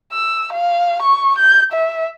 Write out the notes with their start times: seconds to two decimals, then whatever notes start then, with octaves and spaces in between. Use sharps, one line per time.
0.13 E6
0.53 F5
1.02 C#6
1.38 G6
1.72 E5